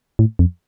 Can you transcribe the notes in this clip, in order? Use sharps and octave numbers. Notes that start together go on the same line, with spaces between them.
A2
F2